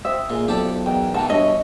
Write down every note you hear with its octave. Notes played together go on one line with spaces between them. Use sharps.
C4 E5 D#6
A#2 F4 G#4
B1 F2 G4 A4 D5
E2 G#3 A#4 G5
B2 E3 F#5 A5
G2 C#5 D#5 E5